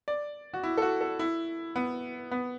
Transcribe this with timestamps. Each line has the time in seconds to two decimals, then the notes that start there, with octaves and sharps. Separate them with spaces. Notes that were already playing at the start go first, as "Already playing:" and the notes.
0.08 D5
0.54 F#4
0.63 E4
0.77 A4
0.82 F#4
1.01 A4
1.19 E4
1.76 B3
2.31 B3